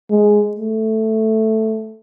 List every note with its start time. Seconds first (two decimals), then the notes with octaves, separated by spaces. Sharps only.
0.10 G#3
0.57 A3